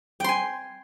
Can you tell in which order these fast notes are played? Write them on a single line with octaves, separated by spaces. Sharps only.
G5 C6 G#5